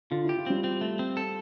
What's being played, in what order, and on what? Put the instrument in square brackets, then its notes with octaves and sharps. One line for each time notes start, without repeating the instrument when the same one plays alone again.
[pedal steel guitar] D3 [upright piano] F4
[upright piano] E4 [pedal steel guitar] G4
[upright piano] F4
[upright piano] G3 [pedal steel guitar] C4
[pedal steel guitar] C4
A3
C4
A4